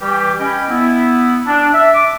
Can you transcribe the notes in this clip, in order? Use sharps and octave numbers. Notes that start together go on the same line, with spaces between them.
E3 G3 G4
C#4 D#5 G5 G#5 B5
B3 E4
D4
E5
D6